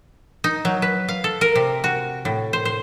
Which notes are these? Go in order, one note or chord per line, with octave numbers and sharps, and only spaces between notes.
D#4
F#3
B4
F5
A4
A#4
C3
F#4
A2
C5
C5